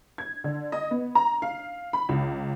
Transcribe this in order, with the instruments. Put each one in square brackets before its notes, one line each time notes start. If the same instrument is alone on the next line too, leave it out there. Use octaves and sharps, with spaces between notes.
[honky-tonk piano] G#6
D3
D#5
B3
A#5
F5
B5
C#2